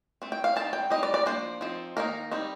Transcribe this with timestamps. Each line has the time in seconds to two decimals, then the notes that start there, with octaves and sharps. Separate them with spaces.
0.22 A3 C4
0.32 G5
0.44 F5
0.56 G3 C4 D#4 A5
0.73 G5
0.90 G3 C4 D#4 D#5
1.03 D5
1.14 D5
1.26 F3 A#3 D4 C5
1.61 F3 C4 D#4
1.97 D#3 A#3 D#4 A#4
2.31 G3 C4 D#4